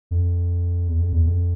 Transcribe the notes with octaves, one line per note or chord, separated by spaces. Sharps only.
F2
E2
F2
E2
F2